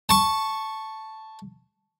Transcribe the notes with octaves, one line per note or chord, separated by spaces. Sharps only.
A5 C#6